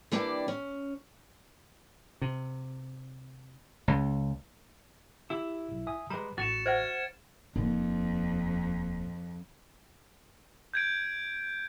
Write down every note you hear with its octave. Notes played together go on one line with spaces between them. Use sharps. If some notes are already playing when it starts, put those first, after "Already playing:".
E3 G3 A#3 D4 D5 G5
C#4
C3
C#2
E4 G4 E6
B1
E5 G#5 D#6
G3 G#3 B4 A#5 B5
A1 F#4 A6 C#7 E7
C5 E5 F#5 F6 G#6 D7
D#1 F2
G6 G#6 D7